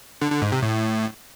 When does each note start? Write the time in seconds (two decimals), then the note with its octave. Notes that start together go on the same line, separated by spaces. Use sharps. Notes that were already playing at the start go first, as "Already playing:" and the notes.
0.21 D3
0.32 D3
0.42 G#2
0.52 C3
0.62 A2